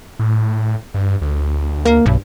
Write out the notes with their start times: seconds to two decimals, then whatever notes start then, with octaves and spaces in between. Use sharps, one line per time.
0.19 A2
0.94 G2
1.22 D2
1.85 A#3
2.06 B1 G2